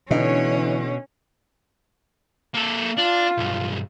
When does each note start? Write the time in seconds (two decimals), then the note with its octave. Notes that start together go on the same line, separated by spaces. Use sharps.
0.11 B2 D3 E3 C#4 D#4 C#5
2.54 A#3 A4
2.97 D4 F4
3.38 B1 G2